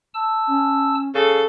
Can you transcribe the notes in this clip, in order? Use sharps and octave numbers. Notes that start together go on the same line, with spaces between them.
A5 E6
C#4
C#3 A4